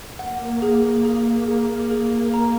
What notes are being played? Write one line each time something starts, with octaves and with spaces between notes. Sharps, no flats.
A#3 F#5
G#4
G#4
G#4
G#4
A#5